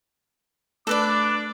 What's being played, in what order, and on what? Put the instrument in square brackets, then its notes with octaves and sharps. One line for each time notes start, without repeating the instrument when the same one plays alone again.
[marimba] A3 [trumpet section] D4 D6 [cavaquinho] A4 B4 D5